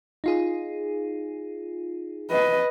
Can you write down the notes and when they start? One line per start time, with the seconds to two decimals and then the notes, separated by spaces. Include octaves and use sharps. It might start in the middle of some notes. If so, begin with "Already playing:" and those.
0.24 D#4 F4 G#4
2.31 B4 D#5